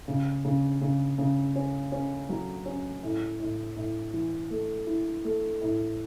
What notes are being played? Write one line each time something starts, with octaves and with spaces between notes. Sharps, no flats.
C#3
C#3
C#3
C#3
C#4
C#4
F#3
C#4
A2
A2
A2
E3
A3
E4
A3
A2